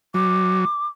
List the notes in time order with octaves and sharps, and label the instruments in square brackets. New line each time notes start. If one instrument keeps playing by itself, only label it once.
[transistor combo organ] F#3 [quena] D6